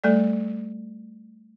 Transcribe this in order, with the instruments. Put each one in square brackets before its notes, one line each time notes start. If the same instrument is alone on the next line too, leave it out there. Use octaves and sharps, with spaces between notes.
[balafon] G3 A3 A4 D5